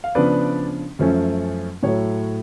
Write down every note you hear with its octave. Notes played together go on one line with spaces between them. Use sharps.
F5
C#3 F3 B3 D4 B4 D5
F#2 F3 A3 C#4
A2 F#3 A3 C#5